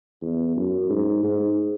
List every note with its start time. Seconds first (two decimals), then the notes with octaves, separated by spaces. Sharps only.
0.22 E2
0.57 F#2
0.90 G#2
1.23 G#2